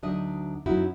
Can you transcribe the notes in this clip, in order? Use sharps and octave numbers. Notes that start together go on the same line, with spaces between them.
D2 F#3 D4 D#4 D#5 E5
F#2 F#3 C#4 D#4 E4 F#4